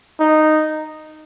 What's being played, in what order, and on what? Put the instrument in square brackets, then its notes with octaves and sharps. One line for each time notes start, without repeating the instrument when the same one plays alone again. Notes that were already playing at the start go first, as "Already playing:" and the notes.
[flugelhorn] D#4